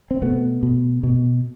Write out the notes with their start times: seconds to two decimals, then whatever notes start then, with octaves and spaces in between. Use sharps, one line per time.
0.11 C4
0.22 B2 A3 B3
0.63 B2
1.03 B2